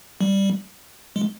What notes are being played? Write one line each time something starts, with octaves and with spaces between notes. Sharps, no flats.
G3
G#3